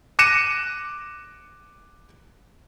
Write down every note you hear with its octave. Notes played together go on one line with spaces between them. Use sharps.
D6 F#6 A#6 C#7 D#7 E7